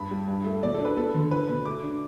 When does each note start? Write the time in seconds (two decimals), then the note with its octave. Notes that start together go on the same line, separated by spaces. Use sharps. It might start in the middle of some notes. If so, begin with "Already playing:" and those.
Already playing: G2 B5
0.11 G3
0.28 G2
0.44 A3
0.63 B2 D5
0.74 A4
0.80 D4
0.85 B4
0.97 B3 A4
1.14 D3
1.31 D4 B4
1.49 B2
1.65 A3 D6
1.83 D4